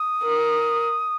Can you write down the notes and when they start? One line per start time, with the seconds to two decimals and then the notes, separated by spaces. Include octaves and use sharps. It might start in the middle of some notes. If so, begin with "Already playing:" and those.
Already playing: D#6
0.23 A#4